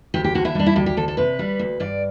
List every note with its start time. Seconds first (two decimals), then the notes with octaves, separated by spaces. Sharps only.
0.14 D2 G4
0.24 G4
0.35 D3 F#4
0.45 E4
0.55 G3 D4
0.66 E4
0.76 D2 G4
0.86 G4
0.97 D2 A4
1.08 A4
1.17 C3 B4
1.39 G3
1.59 D2
1.80 G2 D5